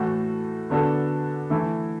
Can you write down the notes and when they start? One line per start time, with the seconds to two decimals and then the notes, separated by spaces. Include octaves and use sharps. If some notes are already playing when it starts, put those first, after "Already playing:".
Already playing: A2 E3 A3 F#4 A4
0.70 D3 B3 D4 F#4 A4
1.50 E3 A3 E4